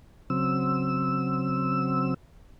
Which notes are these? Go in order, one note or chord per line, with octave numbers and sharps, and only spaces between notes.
C#3 F#3 C4 E6